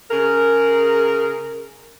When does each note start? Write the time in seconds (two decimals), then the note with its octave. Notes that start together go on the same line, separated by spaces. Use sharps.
0.11 C#3 G#4 A#4